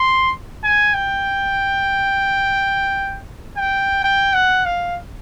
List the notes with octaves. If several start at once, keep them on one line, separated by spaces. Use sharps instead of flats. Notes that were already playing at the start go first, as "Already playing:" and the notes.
Already playing: C6
G#5
G5
G5
G5
F#5
F5